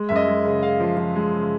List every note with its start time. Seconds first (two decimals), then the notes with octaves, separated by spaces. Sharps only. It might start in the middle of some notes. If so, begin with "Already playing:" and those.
Already playing: G#3
0.09 F#2 E5
0.16 D#5
0.28 G#3
0.44 C#3
0.63 C#3 F5
0.80 F3
0.97 F3
1.15 G#3
1.33 C#3